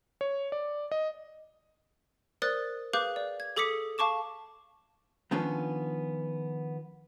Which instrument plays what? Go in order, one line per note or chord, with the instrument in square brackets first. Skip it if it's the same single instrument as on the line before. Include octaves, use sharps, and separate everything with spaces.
[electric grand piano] C#5
D5
D#5
[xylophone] A#4 C5 D5 D#6 F#6 A6
G#4 B4 F5 D6 F#6 G6
D5
G#6
G#4 A4 D6 D#6 B6 C#7
F5 A5 C#6 D6 E7
[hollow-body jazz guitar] D#3 F3 B3 C#4 D4 F4